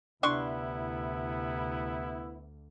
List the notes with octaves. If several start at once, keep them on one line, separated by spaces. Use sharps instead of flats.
D2 C3 B3 D4 E4 C6 C#6